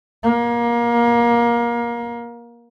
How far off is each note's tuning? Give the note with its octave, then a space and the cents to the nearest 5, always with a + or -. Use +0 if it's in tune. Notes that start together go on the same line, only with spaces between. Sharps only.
A#3 +25